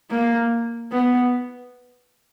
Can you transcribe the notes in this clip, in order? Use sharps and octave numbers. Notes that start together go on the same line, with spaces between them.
A#3
B3